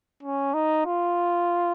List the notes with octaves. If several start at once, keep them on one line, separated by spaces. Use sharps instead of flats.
C#4
D#4
F4